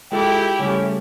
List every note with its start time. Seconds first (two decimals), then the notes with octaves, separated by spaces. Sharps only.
0.12 G#3 E4 F4 G4 A4 G5
0.59 C#3 G3 A3 C#4